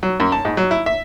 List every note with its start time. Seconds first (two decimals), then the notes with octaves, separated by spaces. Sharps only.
0.03 F#3
0.20 F#2
0.32 A5
0.45 G#2
0.57 F#3
0.71 E4
0.86 E5